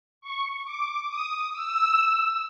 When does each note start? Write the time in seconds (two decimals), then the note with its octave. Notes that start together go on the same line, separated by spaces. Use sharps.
0.21 C#6
0.65 D6
1.08 D#6
1.53 E6